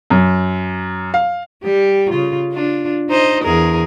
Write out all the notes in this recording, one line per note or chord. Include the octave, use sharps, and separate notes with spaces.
F#2
F5
G3 G4
C#3 F4
D4 F4
D#4 C5 D#5
E2 G#4 A#4